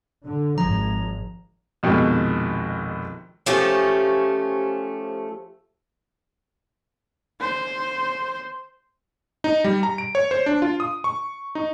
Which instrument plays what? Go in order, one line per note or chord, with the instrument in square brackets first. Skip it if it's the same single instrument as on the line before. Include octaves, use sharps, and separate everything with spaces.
[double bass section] D3
[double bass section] G#1 [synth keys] F3 G#6 [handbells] A#5
[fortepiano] A#1 F2 B2 D#3 G#3
[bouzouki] F3 A3 C#4 G4
[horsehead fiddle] C5
[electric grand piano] D#4
G3
A#5
D7
C#5
C5
D4
F4
D#6
C#6
D#4